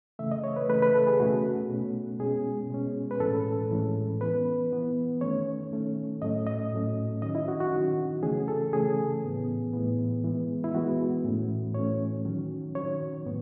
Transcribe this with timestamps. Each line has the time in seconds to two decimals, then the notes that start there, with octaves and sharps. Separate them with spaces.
0.19 C#3 E3 A3 E5
0.31 D#5
0.44 C#5
0.56 B4
0.69 C#3 E3 A3 B4
0.82 B4
0.94 A4
1.07 G#4
1.20 B2 A3 C#4 F#4
1.69 B2 A3 C#4
2.19 B2 G#3 C#4 G#4
2.70 B2 G#3 C#4
3.11 B4
3.20 A2 E3 G#3 C#4 A4
3.70 A2 E3 G#3 C#4
4.21 E3 B3 B4
4.71 E3 B3
5.21 D#3 A3 C#4 C#5
5.72 D#3 A3 C#4
6.22 A2 F#3 A3 C#4 D#5
6.47 D#5
6.72 A2 F#3 A3 C#4
7.22 D#3 F#3 C#4 D#5
7.35 E4
7.48 F#4
7.60 F#4
7.73 D#3 F#3 C#4
8.23 C#3 E3 A3 C#4 G#4
8.48 A4
8.73 C#3 E3 A3 C#4 G#4
9.24 A2 E3 B3
9.73 A2 E3 B3
10.24 E3 G#3 B3
10.64 E4
10.75 E3 G#3 B3 F#4
11.24 A2 E3 A3 C#4
11.74 A2 E3 A3 C#4 C#5
12.25 D#3 F#3 C#4
12.75 D#3 F#3 C#4 C#5
13.26 A2 F#3 B3